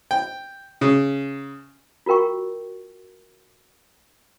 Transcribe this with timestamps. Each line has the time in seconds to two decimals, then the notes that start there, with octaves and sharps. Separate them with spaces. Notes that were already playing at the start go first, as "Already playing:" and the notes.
0.11 G5
0.81 C#3
2.06 F4 F#4 A#4 G5 C#6